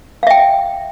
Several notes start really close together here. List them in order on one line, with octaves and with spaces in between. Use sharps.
F5 E5 G5